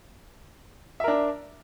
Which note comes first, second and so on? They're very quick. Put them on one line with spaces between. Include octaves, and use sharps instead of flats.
E5 A#4 D4